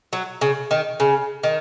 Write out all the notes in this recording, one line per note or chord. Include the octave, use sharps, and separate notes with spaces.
F#3
C#3
D#3
C#3
D#3